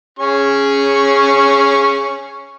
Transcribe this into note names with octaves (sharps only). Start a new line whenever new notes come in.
C#4 G#4 C#6